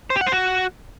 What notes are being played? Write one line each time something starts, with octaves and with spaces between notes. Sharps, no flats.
C5
G4
F#5
C5
F#4